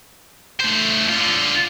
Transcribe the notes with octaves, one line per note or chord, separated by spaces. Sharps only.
A3 C5
D3 F4